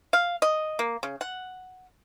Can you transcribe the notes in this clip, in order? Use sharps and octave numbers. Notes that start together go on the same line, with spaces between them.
F5
D#5
A#3
C#3
F#5